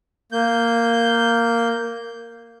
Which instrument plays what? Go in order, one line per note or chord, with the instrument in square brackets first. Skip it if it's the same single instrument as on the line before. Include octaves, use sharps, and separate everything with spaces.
[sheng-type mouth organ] A#3 G6